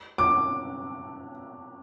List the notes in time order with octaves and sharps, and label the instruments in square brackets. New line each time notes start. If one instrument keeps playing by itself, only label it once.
[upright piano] D6